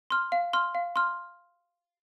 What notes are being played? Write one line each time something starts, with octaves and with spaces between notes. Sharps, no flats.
C6 F6
F5
C6 F6
F5
C6 F6